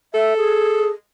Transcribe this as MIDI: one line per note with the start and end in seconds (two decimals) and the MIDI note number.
0.14 0.91 69
0.14 0.34 76
0.37 0.90 68